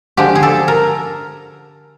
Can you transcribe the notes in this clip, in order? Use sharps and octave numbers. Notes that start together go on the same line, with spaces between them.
D3 F3 G#3 G4
G#4
A4
A#4